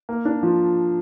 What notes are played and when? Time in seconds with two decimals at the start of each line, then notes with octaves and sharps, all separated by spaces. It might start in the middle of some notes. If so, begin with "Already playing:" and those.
0.09 A#3
0.25 D4
0.43 F3